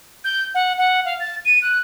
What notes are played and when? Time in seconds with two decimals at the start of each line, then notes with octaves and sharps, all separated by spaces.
0.24 G6
0.54 F#5
0.78 F#5
1.05 F5
1.20 A6
1.45 D#7
1.62 F#6